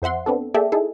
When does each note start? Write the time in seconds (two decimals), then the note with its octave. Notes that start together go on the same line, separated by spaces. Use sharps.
0.02 F2 C5 E5 F#5 C6
0.26 B3 C4 D4 A4
0.54 A#3 G#4 A4 D5 E5 G5
0.72 D#4 E4 G#4 A4